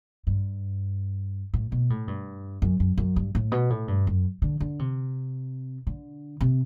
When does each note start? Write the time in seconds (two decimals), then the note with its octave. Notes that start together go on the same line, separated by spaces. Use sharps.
0.27 G2
1.54 A2
1.72 B2
1.90 A2
2.08 G2
2.62 F#2
2.80 F#2
2.98 F#2
3.16 G2
3.35 A2
3.52 B2
3.70 A2
3.88 G2
4.07 F#2
4.42 D3
4.60 D3
4.79 C3
5.87 D3
6.41 C3